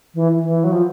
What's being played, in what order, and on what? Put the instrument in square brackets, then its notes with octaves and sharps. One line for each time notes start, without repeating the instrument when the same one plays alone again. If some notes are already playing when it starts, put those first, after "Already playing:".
[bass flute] E3
E3
F#3
F3